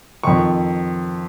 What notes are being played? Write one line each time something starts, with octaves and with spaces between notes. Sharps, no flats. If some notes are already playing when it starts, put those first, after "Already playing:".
F2 D#3 C#6